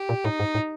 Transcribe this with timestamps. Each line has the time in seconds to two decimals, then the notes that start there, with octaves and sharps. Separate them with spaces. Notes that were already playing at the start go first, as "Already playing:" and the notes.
Already playing: G4
0.09 A#2
0.24 A2 D#4
0.40 G#2
0.55 A2